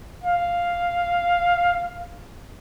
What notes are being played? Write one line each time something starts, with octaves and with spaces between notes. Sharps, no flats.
F5